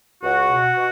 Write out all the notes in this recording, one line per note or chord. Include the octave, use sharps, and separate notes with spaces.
C#2 F#4
B2
B2